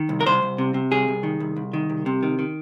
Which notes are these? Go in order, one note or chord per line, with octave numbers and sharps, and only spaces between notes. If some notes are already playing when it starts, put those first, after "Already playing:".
Already playing: D#3
C2
A#4
C2 C5
C2
C3
C3
C2 G#4
C2
D#3
C2
C2
D#3
C2
C3
D#3
D#3